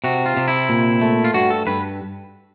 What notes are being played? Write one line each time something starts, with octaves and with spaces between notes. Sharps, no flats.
C3 F#4
F4
C3
E4
A#2
A3
F4
G2 F#4
A4
G2 B4